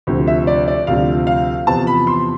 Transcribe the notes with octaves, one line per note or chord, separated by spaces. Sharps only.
D2 C3 F3
E5
D5
D5
D2 C3 F3 F5
F5
E2 C3 F3 B3 A5
B5
C6